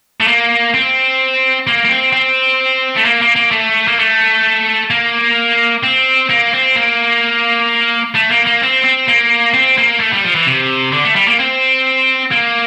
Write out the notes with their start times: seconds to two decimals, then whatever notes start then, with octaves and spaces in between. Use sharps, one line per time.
0.20 A3
0.27 A#3
0.74 C4
1.67 A#3
1.85 A#3
1.89 C4
2.13 C4
2.97 A3
3.05 A#3
3.22 A#3
3.36 A#3
3.51 A3
3.87 A#3
3.99 A3
4.90 A#3
5.83 C4
6.29 A#3
6.53 C4
6.76 A#3
8.15 A3
8.30 A#3
8.46 A#3
8.62 C4
8.84 C4
9.08 A#3
9.54 C4
9.77 A#3
10.00 A3
10.12 G3
10.24 F3
10.35 E3
10.47 C3
10.92 D3
11.04 A3
11.16 G3
11.28 A#3
11.39 C4
12.31 A#3